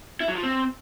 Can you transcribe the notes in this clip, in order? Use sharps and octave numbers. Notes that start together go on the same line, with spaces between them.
E4
F#3
F3
C4